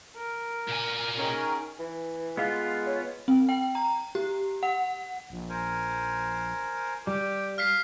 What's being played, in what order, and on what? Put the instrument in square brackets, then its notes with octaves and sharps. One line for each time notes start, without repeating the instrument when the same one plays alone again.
[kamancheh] A#4
[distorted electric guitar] A#2 G#5
[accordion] D#3 C#4 A#4 [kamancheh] G#4 G5
[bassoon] E3
[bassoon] G#3 [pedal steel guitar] B3 F4 [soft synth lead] F5
[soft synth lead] C#5
[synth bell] C4
G5
A#5
G4
F#5
[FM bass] A#1
[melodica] A#4 C5 G#5
[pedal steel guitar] G3 [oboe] G4
[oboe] F5 [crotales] F6 B6 C7